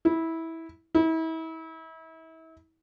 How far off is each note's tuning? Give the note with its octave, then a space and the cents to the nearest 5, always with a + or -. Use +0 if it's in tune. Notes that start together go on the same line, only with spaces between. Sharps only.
E4 -15
E4 -35